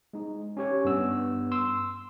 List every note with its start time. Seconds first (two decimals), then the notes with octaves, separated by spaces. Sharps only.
0.13 G#3 D#4
0.57 C#4 G4 C#5
0.85 G2 B3 E6
1.52 C6 E6